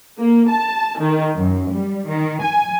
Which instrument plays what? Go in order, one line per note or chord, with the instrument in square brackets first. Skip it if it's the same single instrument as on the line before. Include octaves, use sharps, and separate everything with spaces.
[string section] A#3
A5
D#3
F#2
G3
D#3
G#5